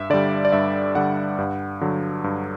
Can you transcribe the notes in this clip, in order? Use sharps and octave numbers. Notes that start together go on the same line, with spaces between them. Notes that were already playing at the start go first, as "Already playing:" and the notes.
Already playing: G2 E5
D3 G3 D5
D5
G2 E5
D3 G3 F#5
G2
D3 F#3
G2